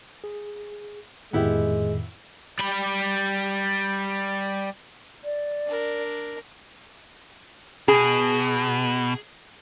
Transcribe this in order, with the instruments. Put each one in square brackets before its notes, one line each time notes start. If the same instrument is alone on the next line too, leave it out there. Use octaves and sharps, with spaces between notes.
[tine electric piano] G#4
[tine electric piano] F2 A2 D#3 [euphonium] G#3 [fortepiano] B3 E4 G4
[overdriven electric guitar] G3 B5
[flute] D5
[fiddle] D4 A#4
[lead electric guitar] B2 [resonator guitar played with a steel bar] G#4